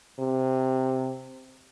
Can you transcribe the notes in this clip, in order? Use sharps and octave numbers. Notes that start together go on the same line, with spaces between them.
C3